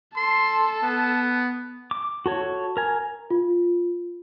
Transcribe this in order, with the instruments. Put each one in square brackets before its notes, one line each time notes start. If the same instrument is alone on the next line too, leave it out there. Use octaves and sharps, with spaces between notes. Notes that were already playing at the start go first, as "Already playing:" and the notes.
[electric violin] A4 A5 [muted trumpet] C6
[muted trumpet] B3
[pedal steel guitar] D6
F#4 A4 C#5
A#4 G#5
[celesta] F4